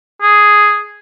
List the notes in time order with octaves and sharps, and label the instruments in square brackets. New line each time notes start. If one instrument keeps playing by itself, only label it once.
[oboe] G#4